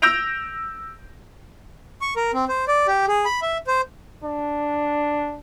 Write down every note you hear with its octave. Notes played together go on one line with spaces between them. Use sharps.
E6 G6 A#6 D7 F7
C#6
A#4
C4
C5
D5
G4
G#4
B5
E5
C5
D4